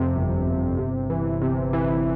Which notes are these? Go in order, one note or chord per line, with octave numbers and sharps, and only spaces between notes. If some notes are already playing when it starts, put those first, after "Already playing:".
Already playing: F2 C3
G1
G1
C3
E3
C3
E3